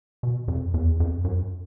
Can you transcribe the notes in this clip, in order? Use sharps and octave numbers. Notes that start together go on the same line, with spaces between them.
B2
F2
E2
F2
F#2